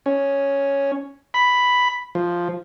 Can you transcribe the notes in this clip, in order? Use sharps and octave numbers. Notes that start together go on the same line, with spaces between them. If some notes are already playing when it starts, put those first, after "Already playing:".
C#4
B5
F3